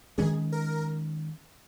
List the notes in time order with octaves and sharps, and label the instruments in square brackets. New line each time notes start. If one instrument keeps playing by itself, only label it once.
[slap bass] D#3 G#3 C#4 [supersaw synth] G#4
[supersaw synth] A#4